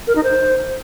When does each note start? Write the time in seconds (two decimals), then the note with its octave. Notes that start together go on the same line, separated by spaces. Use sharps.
0.07 A#4
0.15 D#4
0.24 C5